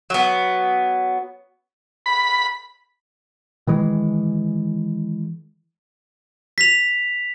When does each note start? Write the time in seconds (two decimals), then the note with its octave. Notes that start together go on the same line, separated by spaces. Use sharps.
0.10 F#3 B3
2.06 B5
3.67 D#3 E3 G#3
6.58 B6 F7